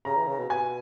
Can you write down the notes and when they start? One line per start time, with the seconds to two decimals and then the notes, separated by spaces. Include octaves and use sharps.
0.05 C#3 A#5
0.16 E3
0.28 C#3
0.39 B2
0.49 B2 G#5